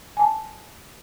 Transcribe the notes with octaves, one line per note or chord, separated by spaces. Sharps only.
G#5 A5